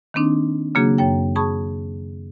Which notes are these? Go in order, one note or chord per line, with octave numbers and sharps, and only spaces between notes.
D#3 A#3 C4 D4 D#4
C#3 F#3 A#3 D4 F#4 G#4
F#2 C#5 G5
G#4 A5 B5 C#6 D#6